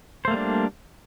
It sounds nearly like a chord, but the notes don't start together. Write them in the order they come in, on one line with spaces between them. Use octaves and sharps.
C5 A3 A#3 G3 D4